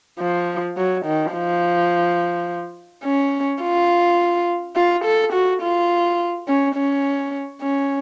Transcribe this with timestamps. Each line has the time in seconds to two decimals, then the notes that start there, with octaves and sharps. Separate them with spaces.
0.20 F3
0.77 F#3
1.06 D#3
1.34 F3
3.05 C#4
3.63 F4
4.76 F4
5.05 A4
5.33 F#4
5.62 F4
6.48 C#4
6.76 C#4
7.62 C#4